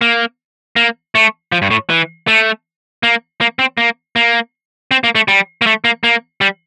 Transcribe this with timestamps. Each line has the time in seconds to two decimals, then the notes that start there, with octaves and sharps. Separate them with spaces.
0.01 A#3
0.76 A#3
1.15 A3
1.52 F3
1.62 G2
1.71 A2
1.90 E3
2.28 A3
3.03 A#3
3.41 A#3
3.59 C4
3.78 A#3
4.16 A#3
4.91 C4
5.04 A#3
5.15 A3
5.28 G3
5.62 A#3
5.67 A3
5.84 A#3
6.04 A#3
6.41 G3